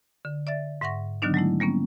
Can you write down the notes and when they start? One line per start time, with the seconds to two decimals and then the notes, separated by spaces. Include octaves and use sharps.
0.25 D3
0.47 D5 E5 A6
0.81 G#2 E5 F#5 C#6 A#6
1.22 D3 D#3 F#3 B3 D4 D#4
1.34 F#3 G#3 A3 E4
1.60 G3 A#3 B3 C#4